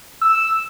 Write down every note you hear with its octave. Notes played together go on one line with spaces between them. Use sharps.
E6